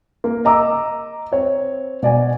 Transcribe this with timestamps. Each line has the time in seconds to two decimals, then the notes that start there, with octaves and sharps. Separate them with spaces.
0.24 A#3
0.45 D#5 A#5 D6 E6
1.32 C4 C#5
2.03 B2 D5 G#5